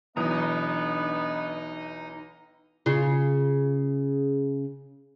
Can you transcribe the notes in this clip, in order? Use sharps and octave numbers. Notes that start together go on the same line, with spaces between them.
B1 E3 B3 D4 D#4 D#5 A#5 D#6
C#3 F4